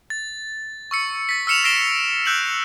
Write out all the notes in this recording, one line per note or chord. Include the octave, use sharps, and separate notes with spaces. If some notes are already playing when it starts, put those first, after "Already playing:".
A6
C#6 E6 C#7
A6 B6
E6 F6 C#7 E7 F7
E6 A#6 C7 D7 E7 G7
E6 F#6 G6 E7 F#7